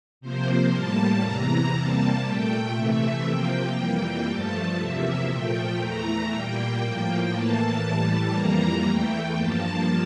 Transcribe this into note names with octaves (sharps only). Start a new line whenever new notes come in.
C3 F3 A#3 C5
A2 G3 A#3 A5
E2 C3 E3 A#5
C3 G3 A#3 A5
A#2 A3 G5
C3 E3 A3 E5
C3 F3 A#3 G5
F2 E3 G3 A#3
G2 F3 A3 A5
E2 C3 F3 A#3 E5
A#2 F3 A3 G5
E2 E3 A3 A#5
A#2 G3 A#3 G5
A2 F3 A#3
A2 E3 A#3 A5
A2 E3 G3
F2 E3 G3 A#3 A#5
E2 E3 A3 G5
G2 F3 A#3 A5